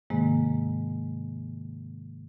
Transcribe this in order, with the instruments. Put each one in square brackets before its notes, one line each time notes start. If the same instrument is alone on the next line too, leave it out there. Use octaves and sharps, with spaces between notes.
[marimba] G#2 C3 D#3 G#3 A#3